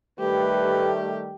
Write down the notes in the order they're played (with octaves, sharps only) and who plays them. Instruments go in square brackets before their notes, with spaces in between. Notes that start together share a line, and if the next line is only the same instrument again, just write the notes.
[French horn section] D#3 G3 A3 [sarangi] G4 [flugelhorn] B4